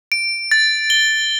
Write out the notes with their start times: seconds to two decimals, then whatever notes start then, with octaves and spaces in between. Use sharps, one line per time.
0.12 D7
0.51 A6
0.90 G7